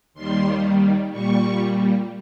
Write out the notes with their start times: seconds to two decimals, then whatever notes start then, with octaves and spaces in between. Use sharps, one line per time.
0.14 D#2 D#3 G3 C6
1.12 A#2 G3 C#6